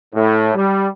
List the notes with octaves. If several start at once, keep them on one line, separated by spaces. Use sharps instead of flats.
A2
G3